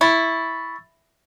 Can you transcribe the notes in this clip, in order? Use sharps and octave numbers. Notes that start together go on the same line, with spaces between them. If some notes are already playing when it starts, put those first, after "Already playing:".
E4 C#6 A6